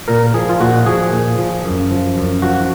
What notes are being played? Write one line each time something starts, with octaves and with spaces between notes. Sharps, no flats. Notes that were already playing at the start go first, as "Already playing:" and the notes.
A#2 A#4
F3 G#4
F4
A#2 F#4
F3 G#4
A#2
F3
F#2
F3
F#2
F3 F#4